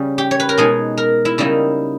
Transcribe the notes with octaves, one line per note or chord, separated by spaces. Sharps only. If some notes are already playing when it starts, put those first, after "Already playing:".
Already playing: C#3 G3 C#4
G4
C#5
B4
A#4
B2 G#3 D#4 G#4
A#4
E4
C#3 G3 A#3 D#4 E4